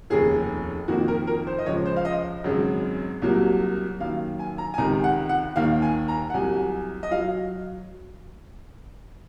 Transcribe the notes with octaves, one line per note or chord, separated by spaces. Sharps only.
F1 D#2 C#3 G#4
F2 D#3 A#3 F#4
A#4
A#4
C5
D#5
C#2 C#3 F3 C#5
C5
F5
D#5
G#1 F#2 C#3 G#3
C2 C3 F#3 A#3
F#2 D#3 A#3 F5
G#5
A#5
G#5
C#2 C3 D#3 A#5
F#5
F#5
D#2 D#3 A#3 F5
G#5
A#5
F#5
C2 C3 F#3 G#5
D#5
F#3 F5